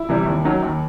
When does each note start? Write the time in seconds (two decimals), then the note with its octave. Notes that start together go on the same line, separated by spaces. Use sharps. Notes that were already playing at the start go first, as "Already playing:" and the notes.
Already playing: E4
0.09 C3 E3 G3
0.26 D#2
0.45 D#3 F#3
0.62 D#2